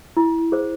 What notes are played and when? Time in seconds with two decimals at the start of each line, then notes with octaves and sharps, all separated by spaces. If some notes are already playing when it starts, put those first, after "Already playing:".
0.17 E4
0.52 G#4 C5